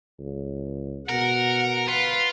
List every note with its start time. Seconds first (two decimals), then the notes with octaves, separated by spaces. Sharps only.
0.19 C#2
1.09 B2 A#4 F#5
1.88 F4 B4 F#5